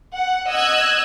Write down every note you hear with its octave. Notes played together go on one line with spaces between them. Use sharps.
F#5
D#5 E6 F#6 G#6